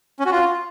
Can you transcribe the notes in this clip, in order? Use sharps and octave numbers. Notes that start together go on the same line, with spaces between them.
C#4
F#4
F4